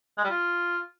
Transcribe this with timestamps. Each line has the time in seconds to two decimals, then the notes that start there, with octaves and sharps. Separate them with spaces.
0.18 G#3
0.24 G3
0.30 F4